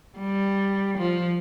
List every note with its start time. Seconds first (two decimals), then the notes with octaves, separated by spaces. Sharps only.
0.18 G3
0.97 F3